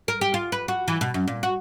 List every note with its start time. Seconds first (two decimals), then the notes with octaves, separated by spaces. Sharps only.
0.08 A#4
0.21 G4
0.34 F4
0.52 B4
0.68 F#4
0.88 E3
1.01 B2
1.14 F#2
1.27 A#2
1.43 F#4